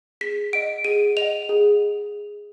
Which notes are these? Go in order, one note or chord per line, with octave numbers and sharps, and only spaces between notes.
G#4 B6
D#5 F#5 D7
G#4 D#7
D#5 F#5 F7
G#4